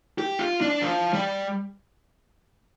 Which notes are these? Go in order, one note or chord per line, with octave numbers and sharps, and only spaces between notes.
G4
F4
D4
F3
G3